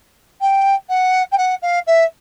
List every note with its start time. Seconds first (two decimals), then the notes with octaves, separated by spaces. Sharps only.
0.41 G5
0.89 F#5
1.32 G5
1.38 F#5
1.62 F5
1.87 E5